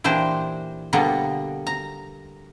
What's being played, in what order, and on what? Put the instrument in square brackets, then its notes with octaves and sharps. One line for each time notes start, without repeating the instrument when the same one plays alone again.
[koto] A#2 E3 D4 G4 C5
B2 D3 G3 A#3 B3
A#5